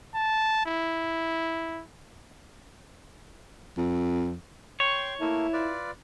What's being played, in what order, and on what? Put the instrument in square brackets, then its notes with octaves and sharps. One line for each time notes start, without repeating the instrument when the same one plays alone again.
[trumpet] A5
E4
[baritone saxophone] F2
[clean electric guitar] C#5 [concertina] G5 C6 C#6
[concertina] A3 A#3 [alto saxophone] E4
[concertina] F4 B4 D5